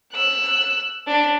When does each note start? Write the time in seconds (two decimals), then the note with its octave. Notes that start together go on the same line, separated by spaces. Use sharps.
0.13 E6 F#6
1.07 D4